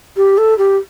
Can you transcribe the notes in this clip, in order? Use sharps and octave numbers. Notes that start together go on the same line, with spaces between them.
G4
A4
G4